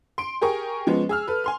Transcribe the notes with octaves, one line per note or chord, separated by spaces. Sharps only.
C6 D7
G4 G#4 A#4 C#6
F3 G#3 B3 C#4
G#4 E6 F6
A4 B4
G#5 C6 F6